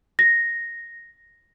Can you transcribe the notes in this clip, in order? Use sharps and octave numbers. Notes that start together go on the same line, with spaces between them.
A#6